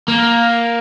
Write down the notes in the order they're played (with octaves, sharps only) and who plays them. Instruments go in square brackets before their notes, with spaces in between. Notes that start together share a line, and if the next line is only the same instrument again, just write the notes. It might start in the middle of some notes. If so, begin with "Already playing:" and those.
[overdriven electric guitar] A#3